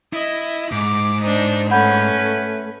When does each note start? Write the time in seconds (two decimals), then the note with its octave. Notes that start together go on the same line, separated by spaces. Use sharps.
0.13 E4 D#5
0.72 G#2 D6
1.22 D4 D#4 C5
1.71 A3 C#4 B4 F#5 B5 G6